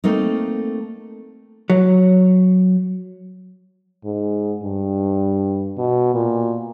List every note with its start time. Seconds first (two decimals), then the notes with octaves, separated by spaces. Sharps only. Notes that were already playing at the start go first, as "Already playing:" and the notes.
0.04 A3 A#3 C4 D#4
1.70 F#3
4.04 G#2
4.63 G2
5.78 B2
6.14 A#2